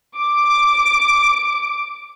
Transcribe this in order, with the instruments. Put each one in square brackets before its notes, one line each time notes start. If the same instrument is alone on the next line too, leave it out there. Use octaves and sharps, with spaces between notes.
[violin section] D6 D7